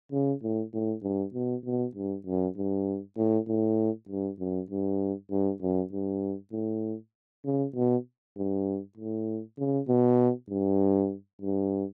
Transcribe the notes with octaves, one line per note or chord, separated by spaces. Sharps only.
C#3
A2
A2
G2
B2
B2
G2
F#2
G2
A2
A2
G2
F#2
G2
G2
F#2
G2
A2
C#3
B2
G2
A2
C#3
B2
G2
G2